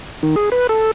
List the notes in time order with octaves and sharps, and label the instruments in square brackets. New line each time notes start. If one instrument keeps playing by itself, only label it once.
[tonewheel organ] D#3
G#4
B4
A4